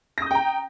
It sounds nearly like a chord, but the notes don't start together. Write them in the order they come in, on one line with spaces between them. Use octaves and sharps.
A#6 D#6 G6 G5 A#5